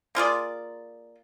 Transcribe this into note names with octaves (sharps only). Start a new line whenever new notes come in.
A#3 F4 G#4 D5